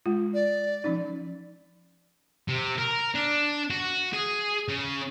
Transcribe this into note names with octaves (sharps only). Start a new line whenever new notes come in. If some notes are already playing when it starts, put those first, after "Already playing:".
G#3 F4
D5
F3 C#4 D#4
C3
A#4
D4
F#4
G#4
C#3